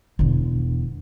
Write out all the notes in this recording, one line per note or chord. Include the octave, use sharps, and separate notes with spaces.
E1 D3